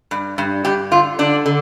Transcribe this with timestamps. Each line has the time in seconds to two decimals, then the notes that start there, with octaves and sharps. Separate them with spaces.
0.11 G2
0.38 G2
0.65 G2 G4
0.91 D3 F4
1.19 D3 D4
1.46 D3